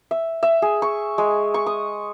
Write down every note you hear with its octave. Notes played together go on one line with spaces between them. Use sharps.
E5
E5
G#4
C#6
G#3
C#6
D#6